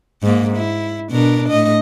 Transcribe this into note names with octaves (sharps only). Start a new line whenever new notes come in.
G#2 A#3
E4
B2 D4 A#4
A2 D#5